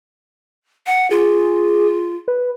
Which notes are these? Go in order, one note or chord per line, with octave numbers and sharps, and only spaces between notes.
F#5
F4 G#4
B4